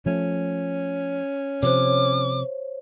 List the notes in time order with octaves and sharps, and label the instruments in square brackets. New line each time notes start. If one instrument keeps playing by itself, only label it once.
[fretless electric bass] F3 A3 [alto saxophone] C#4
[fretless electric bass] C3 F3 [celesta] C5 C#5 [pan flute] D6